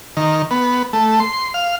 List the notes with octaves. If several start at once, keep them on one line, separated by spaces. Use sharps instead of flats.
D#3
B3
A3
C6
F5